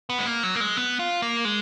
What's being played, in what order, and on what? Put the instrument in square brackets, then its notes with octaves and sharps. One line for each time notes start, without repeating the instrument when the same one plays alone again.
[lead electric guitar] B3
G#3
A#3
F#3
A#3
G#3
B3
F4
A#3
G#3